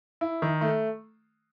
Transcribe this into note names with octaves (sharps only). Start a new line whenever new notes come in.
E4
D#3
A3